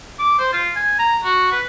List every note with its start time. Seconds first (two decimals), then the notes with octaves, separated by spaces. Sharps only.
0.19 D6
0.39 C5
0.53 F4
0.76 G#5
0.99 A#5
1.24 F#4
1.52 B4